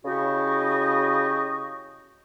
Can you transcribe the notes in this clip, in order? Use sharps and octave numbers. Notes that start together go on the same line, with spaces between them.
C#3 E4 F#4 G4 D#5 C#6